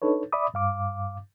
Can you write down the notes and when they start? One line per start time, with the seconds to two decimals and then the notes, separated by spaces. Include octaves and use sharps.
0.02 D4 D#4 A4 B4 C#5
0.32 D5 E5 B5 D6 D#6
0.54 G2 F5 D6